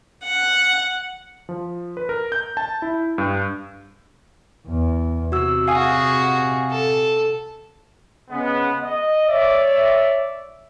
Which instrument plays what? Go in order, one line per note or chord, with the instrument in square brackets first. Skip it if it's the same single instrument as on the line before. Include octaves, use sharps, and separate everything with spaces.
[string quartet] F#5
[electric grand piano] F3
B4
A#4
G6
A5
E4
G2
[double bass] E2
[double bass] C3 [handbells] F#4 E6
[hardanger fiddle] F#4 G#4 [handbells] F5 G#5 D#6
[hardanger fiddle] A4
[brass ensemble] C#3 G#3 B3
D#5
C#5 D5 E5